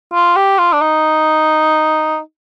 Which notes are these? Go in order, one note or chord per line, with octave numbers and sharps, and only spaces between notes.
F4
G4
F4
D4
D#4